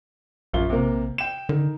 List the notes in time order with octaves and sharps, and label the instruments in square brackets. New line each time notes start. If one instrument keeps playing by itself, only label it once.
[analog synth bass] A#1 [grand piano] F#2 F4 G7
[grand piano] C3 A#3
G5 E7
[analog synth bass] D3 [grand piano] D#3